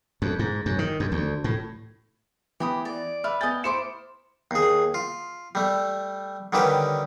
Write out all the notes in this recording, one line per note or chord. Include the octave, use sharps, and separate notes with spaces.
F2
G#2
F#2
D#3
F#2
D2
A2
E3 B3 G4 B5 D#6
D5
B4 E5 F6
B3 D#5 G5 G#5 A6
E4 C5 D6 C#7 E7
D#2 G#4
F4
G3 A3
D3 D#3 G3 C#4 G4 B4